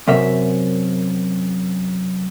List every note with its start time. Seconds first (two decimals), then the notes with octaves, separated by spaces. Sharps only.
0.08 F#2 C3 A#4 E5